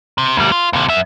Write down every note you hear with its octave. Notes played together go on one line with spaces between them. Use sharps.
C3
D2 G3
F4
D#2 C3
F#2 E5